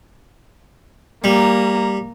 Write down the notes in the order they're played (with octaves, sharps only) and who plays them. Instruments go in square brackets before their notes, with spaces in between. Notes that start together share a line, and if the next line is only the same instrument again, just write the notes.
[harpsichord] G3 [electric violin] A#3 A#5